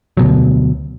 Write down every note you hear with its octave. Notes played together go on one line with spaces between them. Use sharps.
D2 B2 F#3